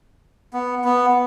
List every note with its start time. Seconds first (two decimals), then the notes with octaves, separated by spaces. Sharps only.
0.53 B3
0.84 B3